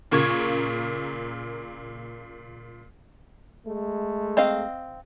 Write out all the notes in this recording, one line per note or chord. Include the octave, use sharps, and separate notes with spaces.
A#2 C#3 A#3 C#6 G#6
G#3 A3
C4 D#5 F5